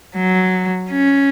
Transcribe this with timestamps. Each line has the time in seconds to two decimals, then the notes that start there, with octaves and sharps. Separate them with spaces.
0.16 F#3
0.91 C#4